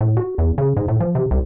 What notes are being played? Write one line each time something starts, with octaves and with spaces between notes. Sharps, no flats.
A2
F#4
E2
C#3
G#2
A2
F3
C3
C2